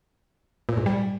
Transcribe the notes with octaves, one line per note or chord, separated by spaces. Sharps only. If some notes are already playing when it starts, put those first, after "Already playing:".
A#2
G#2
G3